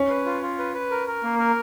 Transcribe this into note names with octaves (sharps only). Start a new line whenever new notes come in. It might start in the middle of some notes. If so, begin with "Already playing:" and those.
Already playing: C#4
B4
F4
F4
B4
B4
A#4
A#4
A#3
A#4